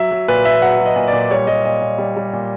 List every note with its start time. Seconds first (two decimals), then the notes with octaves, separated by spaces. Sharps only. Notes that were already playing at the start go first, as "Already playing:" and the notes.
Already playing: F#3 E5
0.11 F#3
0.28 A#2 B4
0.45 A#2 E5
0.62 F#3 F#5
0.80 F#3
0.86 D#5
0.96 A#2
1.08 D5
1.13 A#2
1.31 G3 C#5
1.47 G3 D#5
1.65 A#2 D#5
1.81 A#2
1.98 G3
2.17 G3
2.33 A#2